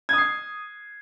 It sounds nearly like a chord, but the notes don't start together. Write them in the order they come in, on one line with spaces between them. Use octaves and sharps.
G#6 D#6 C7